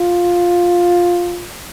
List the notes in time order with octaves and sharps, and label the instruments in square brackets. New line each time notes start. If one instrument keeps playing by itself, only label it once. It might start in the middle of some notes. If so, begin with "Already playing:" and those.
Already playing: [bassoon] F4